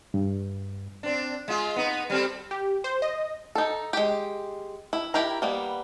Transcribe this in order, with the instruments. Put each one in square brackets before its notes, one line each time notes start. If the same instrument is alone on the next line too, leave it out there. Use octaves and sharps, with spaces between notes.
[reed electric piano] G2
[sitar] C4 D4
G#3 F4
B3 D#4
G3 C4 A4
[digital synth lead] G4
C5
D#5
[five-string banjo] D#4 A4
G#3 G4
E4
E4 G4 A#4 A#5
G3 A#3 B3